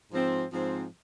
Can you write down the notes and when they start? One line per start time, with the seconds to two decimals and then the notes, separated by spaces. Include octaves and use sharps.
0.12 G#2 F3 C4
0.52 G#2 F3 C4